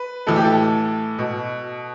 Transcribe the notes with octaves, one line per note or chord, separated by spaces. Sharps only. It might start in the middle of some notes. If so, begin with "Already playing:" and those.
Already playing: B4
A2 E3 A4
G4
A4
B2